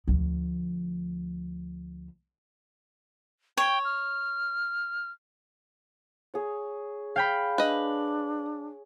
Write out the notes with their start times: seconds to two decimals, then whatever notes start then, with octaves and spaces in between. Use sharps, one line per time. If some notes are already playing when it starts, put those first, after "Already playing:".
0.08 D2 F3
3.57 C#5 G5
3.85 F6
6.34 G#4 C#5
7.16 F5 G5 B5
7.58 D4 B4 D#5